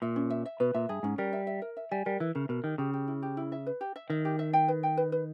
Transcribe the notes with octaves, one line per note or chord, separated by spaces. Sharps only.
A#2 E5
C#4
E5
E5
B2 B4
A#2 E5
G2 G#4
G#2 C#4
G3 A#4
E5
E5
A#4
E5
G3 G#5
G3 A#4
E3 E5
C#3 A#4
B2 A#4
D#3 G4
C#3 G4
G4
E4
G4
E4
E5
B4
G4
E5
D#3 E5
G4
E5
G5
B4
G5
B4
B4